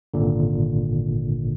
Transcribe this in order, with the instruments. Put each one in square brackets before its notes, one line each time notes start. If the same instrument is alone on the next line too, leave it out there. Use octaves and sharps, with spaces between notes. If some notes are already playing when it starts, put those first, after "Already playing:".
[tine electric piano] G#1 A#2 D3